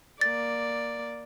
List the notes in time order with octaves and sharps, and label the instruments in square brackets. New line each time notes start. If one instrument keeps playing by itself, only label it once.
[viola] A#3 D5 [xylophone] A6